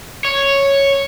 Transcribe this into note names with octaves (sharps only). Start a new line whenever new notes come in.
C#5